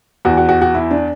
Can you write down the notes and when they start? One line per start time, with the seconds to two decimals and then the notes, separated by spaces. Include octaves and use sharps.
0.25 E2 E3 F#4
0.37 F#4
0.49 F#4
0.62 F#4
0.75 E4
0.91 D4